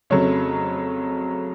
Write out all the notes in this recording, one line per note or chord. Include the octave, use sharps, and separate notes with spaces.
F2 C#3 F#3 A3 C#5